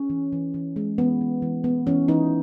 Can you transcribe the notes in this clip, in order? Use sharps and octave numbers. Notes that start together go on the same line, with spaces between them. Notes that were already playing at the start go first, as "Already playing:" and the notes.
Already playing: C#4
E3
E3
E3
G#3
E3 B3
E3
E3
B3
E3 C#4
E3 D#4